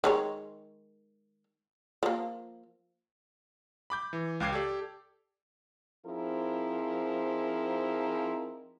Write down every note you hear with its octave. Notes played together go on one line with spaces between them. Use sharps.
D#3 G#3 C#5
F3 A#3
B5 D6 G6
E3
C#2 F5 G5 D6 G#6 C7
G4 A4 D5
F3 C4 D#4 E4 G#4 A#4